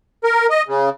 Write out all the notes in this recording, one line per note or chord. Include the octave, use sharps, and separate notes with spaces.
A#4
D#5
C#3